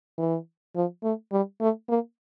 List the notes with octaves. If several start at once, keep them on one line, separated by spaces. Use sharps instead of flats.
E3
F3
A3
G3
A3
A#3